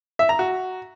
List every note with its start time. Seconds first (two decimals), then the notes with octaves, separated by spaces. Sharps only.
0.19 E5
0.29 A#5
0.39 F#4